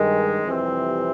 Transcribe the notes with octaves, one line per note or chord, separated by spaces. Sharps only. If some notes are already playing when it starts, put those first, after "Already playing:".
Already playing: G2 D#3 G#3
F2 C3 E3 G3 C4